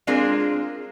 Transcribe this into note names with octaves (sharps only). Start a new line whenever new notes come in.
G#3 C4 D4 F4 G#4 A#4